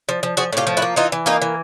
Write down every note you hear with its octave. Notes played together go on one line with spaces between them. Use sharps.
F3
F3
F3 F#4 G#4
A2 F4 G4
F3
E4 F#4
A#3
E3 D#4 F4
E3
A#3 D#4 F4
E3